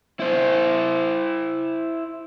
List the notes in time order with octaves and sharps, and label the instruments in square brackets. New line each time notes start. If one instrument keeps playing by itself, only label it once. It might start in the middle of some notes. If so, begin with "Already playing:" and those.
[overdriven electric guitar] E4 C5